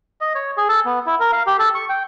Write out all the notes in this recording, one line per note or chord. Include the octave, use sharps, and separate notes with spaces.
D#5
C#5
G#4
A4
B3
E4
A#4
F5
G4
A4
C#6
G5